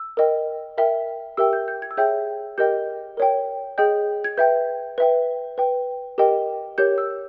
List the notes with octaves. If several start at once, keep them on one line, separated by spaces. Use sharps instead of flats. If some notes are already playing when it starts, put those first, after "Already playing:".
Already playing: E6
A#4 D#5 G5
A#4 E5 G5
G4 A#4 E5 G5 E6
G6
G6
G#6
E6
G#4 C#5 E5 G5 G6
G4 A#4 D#5 G5 G6
A#4 C#5 G5
G#4 D#5 G5 G6
G#6
B4 E5 G5 G6
B4 E5 G5
B4 G5
G4 A#4 D#5 G5
G4 A#4 C#5 G6
E6